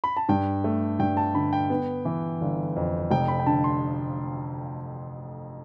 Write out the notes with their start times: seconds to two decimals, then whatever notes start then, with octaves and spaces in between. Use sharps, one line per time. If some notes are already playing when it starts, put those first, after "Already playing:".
0.04 B5
0.17 A5
0.29 G2 G5
0.64 A3
0.99 G2 G5
1.17 A5
1.34 D3 B5
1.53 G5
1.70 B3
2.05 E3
2.41 G1
2.76 F2
3.11 F1 G5
3.28 B5
3.40 G5
3.46 D3 A5
3.64 C6